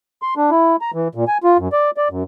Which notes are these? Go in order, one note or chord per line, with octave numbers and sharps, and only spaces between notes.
C6
D4
E4
A#5
E3
A#2
G#5
F4
F#2
D5
D5
F#2